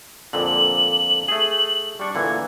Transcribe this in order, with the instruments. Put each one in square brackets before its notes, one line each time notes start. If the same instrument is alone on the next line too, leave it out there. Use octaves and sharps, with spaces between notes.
[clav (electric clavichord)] F2 A#2 D3 [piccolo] F#7
[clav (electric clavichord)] A3 G#4
[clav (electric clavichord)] G3 D4 [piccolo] C#6
[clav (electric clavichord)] A#2 D3 E3 [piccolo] G#6